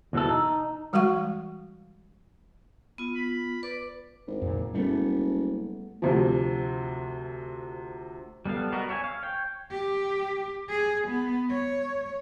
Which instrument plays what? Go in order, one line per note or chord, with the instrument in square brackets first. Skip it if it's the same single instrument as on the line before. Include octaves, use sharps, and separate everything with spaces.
[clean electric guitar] E2 B2 E3 A4
D#4
[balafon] E3 G3 G#3 F#4 F5 C#6
[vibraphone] B3 F4
[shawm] B5
[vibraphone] B4 [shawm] D5
[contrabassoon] G#1
[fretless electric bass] F2 A#2
[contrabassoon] F#1 [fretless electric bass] G3 A3 B3
[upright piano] D2 C3 F3
[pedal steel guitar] G3 B3 A4 F5
B3 F#4 A#4 D#5
C#5 E5 G5 G#5
F5
C#5 G5
[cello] G4
G#4
B3
C#5